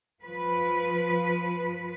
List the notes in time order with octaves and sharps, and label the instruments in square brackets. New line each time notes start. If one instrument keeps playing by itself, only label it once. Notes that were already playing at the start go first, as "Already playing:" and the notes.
[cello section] F3 B4